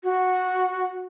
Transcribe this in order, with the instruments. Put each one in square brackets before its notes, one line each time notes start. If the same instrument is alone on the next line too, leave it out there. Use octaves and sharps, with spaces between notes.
[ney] F#4